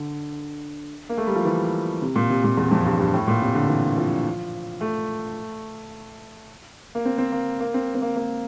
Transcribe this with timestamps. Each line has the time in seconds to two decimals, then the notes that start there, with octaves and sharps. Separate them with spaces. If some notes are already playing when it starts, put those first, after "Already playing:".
Already playing: D3
1.09 A#3
1.17 A3
1.27 G3
1.36 F3
1.45 E3
2.02 C3
2.16 A#2
2.30 C3
2.44 A#2
2.57 E2
2.71 F2
2.85 G2
2.99 G2
3.14 A2
3.28 A#2
3.42 C3
3.55 D3
3.69 E3
3.98 F3
4.81 A3
6.95 A#3
7.05 C4
7.18 C4
7.32 A#3
7.60 A#3
7.74 C4
7.95 C4
8.02 A#3
8.16 A#3